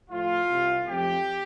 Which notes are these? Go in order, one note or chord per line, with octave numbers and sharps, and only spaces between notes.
A2 F3 A3 F4
C2 C3 G3
F2 F3 A3 C4 G4